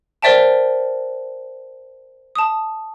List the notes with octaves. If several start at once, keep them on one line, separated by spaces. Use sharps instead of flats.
A#4 C5 D5 E5 G5 A5
A5 D#6